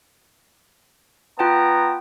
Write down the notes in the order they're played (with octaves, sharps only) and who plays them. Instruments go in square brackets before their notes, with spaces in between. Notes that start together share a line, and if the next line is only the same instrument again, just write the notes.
[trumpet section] B3 A#5 [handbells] F4 G5 A5